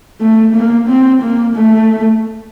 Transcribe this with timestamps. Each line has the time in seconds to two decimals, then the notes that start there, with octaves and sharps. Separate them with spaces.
0.20 A3
0.54 A#3
0.89 C4
1.22 A#3
1.56 A3